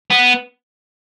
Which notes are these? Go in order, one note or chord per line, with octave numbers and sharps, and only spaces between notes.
B3